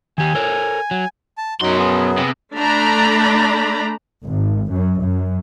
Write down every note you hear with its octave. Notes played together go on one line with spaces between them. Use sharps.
D#3 G4 G#5
A4 A#4 C#5
F#3
A5
F#2 B2 F#3 D#4 F#4 C6
B3 G#4
C3
A3 D4 A#5 B5
G#1
F#2
F#2